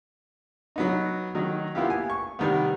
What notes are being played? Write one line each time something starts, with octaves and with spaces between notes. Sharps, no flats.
F#3 B3 D#4
D#3 F#3 D#4
A#3 B3 E4 F4 G4
G#5
C#6
C3 D#3 G3 B3